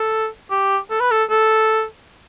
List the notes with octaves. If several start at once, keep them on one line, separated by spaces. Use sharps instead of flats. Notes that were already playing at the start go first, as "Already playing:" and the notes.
Already playing: A4
G4
A4
B4
A4
A4